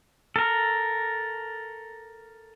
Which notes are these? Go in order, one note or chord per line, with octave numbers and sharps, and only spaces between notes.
A4 A#4